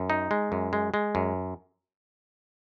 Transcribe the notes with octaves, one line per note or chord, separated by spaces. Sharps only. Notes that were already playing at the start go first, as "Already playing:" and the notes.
Already playing: F#2
D#4
G#3
F#2
G#3
G#3
F#2